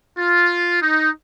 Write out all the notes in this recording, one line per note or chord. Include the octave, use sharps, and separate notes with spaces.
F4
D#4